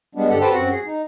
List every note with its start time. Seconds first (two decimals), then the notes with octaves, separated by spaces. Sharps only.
0.15 G3 G#3 B3 D4
0.29 G2 D3 G4 A4 F#5
0.41 G4 A4 B4 C5 G5 A5
0.53 F#2 C4 F#4 F#5
0.71 G#4
0.85 D#4